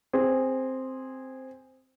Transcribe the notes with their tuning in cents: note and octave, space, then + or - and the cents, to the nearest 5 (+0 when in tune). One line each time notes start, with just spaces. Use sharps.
C4 +0 G#4 -10